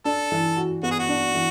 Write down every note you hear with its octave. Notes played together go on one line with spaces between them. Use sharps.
D4 A4
E3
F#4
B3 F#4
G#4
F#4
D4
E3